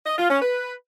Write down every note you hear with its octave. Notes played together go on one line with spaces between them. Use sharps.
D#5
F4
C#4
B4